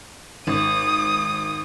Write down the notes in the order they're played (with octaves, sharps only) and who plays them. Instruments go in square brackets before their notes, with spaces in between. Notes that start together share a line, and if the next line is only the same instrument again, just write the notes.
[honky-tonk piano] G#1 [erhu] D#6